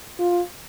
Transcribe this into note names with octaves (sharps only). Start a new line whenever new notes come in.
F4